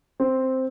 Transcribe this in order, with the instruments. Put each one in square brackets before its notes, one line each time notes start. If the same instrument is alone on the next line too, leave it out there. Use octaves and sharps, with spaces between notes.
[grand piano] C4